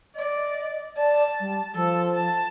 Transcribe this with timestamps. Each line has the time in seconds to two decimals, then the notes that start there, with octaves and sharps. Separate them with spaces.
0.15 D5 D#5
0.97 D5 A5
1.40 G3
1.75 F3 A4
2.15 A5